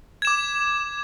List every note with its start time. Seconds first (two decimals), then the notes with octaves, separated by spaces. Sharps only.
0.22 G#6
0.25 E7
0.27 D6